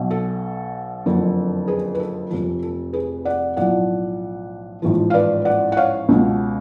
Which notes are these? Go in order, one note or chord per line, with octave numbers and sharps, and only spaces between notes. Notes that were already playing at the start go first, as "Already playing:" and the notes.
Already playing: B1 B2
A4
F#1 F2 D3
G#4 B4
B4
A4
F1 F2 F3 A4
A4
G#4 B4
D5 F#5
B1 A2 F3 D5 F#5
A1 G#2 F3
F5
B4 D5
D5 F#5
F#5
C#5 F5
C#2 B2